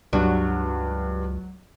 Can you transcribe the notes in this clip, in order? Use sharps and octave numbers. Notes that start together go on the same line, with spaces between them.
C#2 G2 F#3